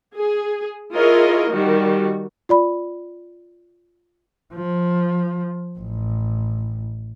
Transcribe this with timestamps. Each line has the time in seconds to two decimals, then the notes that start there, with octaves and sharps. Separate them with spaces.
0.15 G#4
0.95 E4 F4 G#4 A#4 C#5 D#5
1.52 D#3 G3 F#4
2.49 F4 D5 B5
4.54 F3
5.79 A1